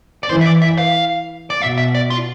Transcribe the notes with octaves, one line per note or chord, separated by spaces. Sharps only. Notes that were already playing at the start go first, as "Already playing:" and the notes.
D5
E3 C5
E5
D5
E5
F5
D5
B2 E5
E5
D5
F4